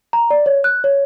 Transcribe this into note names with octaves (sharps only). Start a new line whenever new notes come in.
A#5
D5
C#5
F#6
C#5